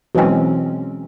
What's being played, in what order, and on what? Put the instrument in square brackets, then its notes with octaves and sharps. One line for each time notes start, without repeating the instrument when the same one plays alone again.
[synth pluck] B2 E3 F#3 G#3 C4 C#4